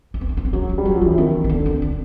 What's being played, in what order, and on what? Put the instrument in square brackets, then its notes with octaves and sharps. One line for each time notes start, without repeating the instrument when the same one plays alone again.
[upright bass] C#4
C4
D4
C#4
C4
[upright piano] F#3 [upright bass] C#4
[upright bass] D4
[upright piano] G3
[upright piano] F#3 [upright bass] C#4
[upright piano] F3
[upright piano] E3 [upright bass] C#4
[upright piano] D#3 [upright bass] C4
[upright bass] A#3
[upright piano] D3 [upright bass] B3
[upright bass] C4
D4